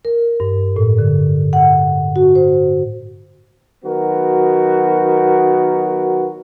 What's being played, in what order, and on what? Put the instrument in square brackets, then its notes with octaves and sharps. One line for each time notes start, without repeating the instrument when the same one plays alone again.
[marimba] A#4
G2
A2
D3
F#5
F#4
C5
[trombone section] D#3 F#3 B3 F#4 A#4